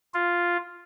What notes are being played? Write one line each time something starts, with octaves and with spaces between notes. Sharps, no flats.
F4